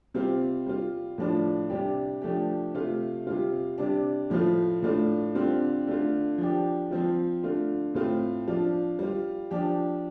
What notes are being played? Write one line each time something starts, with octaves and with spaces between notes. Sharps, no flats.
C3 G3 C4 F4
G3 F4
A2 F3 D4 F4
C3 G3 D4 G4
F3 A3 D4 G4
C3 A3 F4
C3 G3 F4
C3 G3 D4
A2 F3 A3 F4
A2 A3 D4 F4
D3 G3 C4 F4
D3 A3 F4
F3 D4 G4
F3 C4 F4
D3 A3 F4
A2 A3 C4 F4
F3 D4 F4
G3 F4
F3 D4 G4